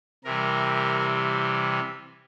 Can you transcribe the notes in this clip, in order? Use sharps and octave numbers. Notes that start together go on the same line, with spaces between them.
C3 E3 G3 A#4